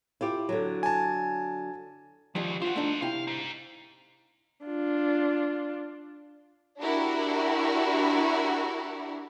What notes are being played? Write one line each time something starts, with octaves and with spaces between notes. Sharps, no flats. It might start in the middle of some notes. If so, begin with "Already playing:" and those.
E4 F4 G4
D3 F#3
G#5 A5
C#2 D#3 F3 G3
F4 F#4 C5 F#5
A3 D4 D#4
C3 E4 F5 G5
D#4 C5
D4 F4
D4 E4 F#4 G4 A#4